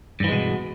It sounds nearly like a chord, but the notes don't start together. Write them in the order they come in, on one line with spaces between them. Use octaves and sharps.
G2 E3 G#3 B2